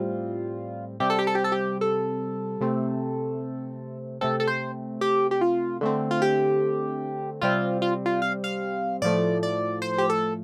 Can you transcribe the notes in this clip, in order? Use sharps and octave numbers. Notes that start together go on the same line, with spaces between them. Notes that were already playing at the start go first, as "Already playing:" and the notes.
Already playing: A2 G3 C4 F4
C3 G3 C4 G4
A4
G4
A4
G4
A4
G4
A4
C3 A3 C4
C3 A3 C4 A4
A4
C5
G4
G4
F4
D3 A3 C4
F4
G4
C3 G3 C4 F4
F4
F4
F5
F5
A2 F3 A3 D5
D5
C5
G4
A4